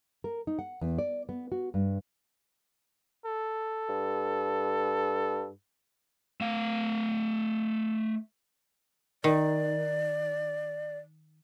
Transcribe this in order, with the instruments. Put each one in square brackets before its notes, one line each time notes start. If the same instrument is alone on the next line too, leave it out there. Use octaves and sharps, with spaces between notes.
[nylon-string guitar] A#4
D#4
F#5
E2
D5
B3
F#4
G2
[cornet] A4
[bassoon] G2
[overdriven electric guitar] A3 F5
[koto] D#3 [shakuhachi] D5